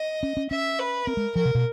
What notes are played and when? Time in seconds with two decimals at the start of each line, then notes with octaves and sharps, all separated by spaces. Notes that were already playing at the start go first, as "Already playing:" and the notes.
Already playing: D#5
0.23 C#4
0.37 C#4
0.51 C#4 E5
0.79 B4
1.07 C4 A#4
1.17 G#3
1.36 F3 A#4
1.45 C3
1.55 B2